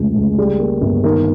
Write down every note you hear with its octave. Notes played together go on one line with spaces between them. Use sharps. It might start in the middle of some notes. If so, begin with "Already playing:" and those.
Already playing: F1 C#2 G#3
C#2
G3 G#4
A#3
G1
D#3 A#4